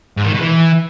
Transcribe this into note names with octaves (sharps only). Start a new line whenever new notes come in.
G#2
D#3
B2
E3